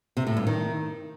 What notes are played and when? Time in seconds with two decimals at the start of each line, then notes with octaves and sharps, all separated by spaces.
0.17 C3
0.27 A2
0.37 G2
0.47 D#3